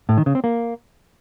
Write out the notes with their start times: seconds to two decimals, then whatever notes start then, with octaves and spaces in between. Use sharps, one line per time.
0.09 A2
0.18 D#3
0.26 C#3
0.35 C4
0.44 A#3